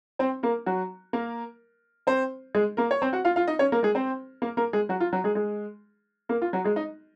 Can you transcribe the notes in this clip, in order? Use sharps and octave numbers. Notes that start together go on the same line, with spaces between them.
C4 C5
A#3 A#4
F#3 F#4
A#3 A#4
C4 C5
G#3 G#4
A#3 A#4
C#5
C4 C5
F#4 F#5
F4 F5
F4 F5
D#4 D#5
C#4 C#5
A#3 A#4
G#3 G#4
C4 C5
A#3 A#4
A#3 A#4
G#3 G#4
F#3 F#4
F4
F#3 F#4
G#3 G#4
G#3 G#4
A#3 A#4
F4
F#3 F#4
G#3 G#4
D#4 D#5